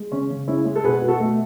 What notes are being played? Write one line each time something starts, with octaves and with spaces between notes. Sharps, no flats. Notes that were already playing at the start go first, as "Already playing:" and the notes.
Already playing: G#3
C#3 C#4
C#3
G#3 C#4 E4
G#3
A4
B2 G#4 B4
B2
F#4 A4
A3